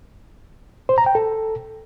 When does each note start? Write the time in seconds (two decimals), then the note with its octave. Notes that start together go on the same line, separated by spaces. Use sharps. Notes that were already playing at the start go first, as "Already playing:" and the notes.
0.89 C5
0.98 A#5
1.06 G5
1.15 A4